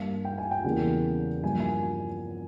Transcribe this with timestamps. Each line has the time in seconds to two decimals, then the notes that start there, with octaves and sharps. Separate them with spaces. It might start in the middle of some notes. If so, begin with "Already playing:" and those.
Already playing: G2 G3 A#3 F5
0.25 G5
0.38 G#5
0.51 G5
0.64 E2 C#3 G3 A#3
1.43 G2 F3 A#3 G#5
1.60 G#5